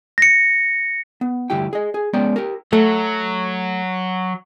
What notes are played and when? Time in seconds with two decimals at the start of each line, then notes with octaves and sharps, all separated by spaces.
0.18 A#6 C#7
1.21 B3
1.50 D2 G2 E4 G4 G5
1.73 G#4 D#5
1.94 G#4
2.13 G#3 B3 C#4 D5 G5 A#5
2.36 G4 A#4
2.73 F#3 A3